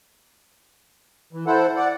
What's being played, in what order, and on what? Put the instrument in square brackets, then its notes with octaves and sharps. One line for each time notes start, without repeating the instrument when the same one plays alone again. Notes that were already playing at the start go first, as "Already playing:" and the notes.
[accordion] E3
E4 A4 C5 F#5
D5 F#5